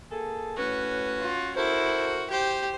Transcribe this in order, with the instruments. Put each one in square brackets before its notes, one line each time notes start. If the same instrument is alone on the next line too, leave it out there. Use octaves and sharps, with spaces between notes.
[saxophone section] A#3 G#4 A4
[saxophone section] A2 B4 [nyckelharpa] C#4 F#4
[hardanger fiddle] F4
[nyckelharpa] E4 [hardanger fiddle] F#4 [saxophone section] A4 A#4 C5
[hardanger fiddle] G4 [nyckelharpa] C5